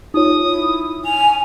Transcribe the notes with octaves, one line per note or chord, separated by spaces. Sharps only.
D#4 F4 C#5 D#6
E4
G#5 F7